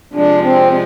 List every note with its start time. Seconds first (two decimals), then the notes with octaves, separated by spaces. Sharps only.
0.13 C3 F3 G#3 D4
0.43 C4